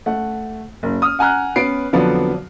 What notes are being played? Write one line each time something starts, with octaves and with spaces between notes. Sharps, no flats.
A3 F#5
F#1
D#6 F6
F#5 G#5 A#5 F6 F#6
B3 C#4 B4 C7 D7
F2 D3 F3 F#3 B3 D4